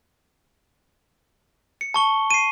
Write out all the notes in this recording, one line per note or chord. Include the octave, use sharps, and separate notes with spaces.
C#7
A5 C#6 G7
C7 D#7